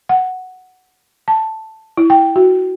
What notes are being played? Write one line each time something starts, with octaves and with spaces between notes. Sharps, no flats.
F#5
A5
E4
G5
F#4